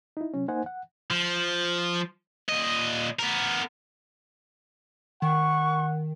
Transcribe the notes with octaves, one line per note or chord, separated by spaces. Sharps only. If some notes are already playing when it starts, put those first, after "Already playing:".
D#4 E4
C3 F#3 C#4
A#3 D#4 C5 F#5 G#5
F#5
F3
A#2 D#5
B3 A#4
D#3 F#5 C#6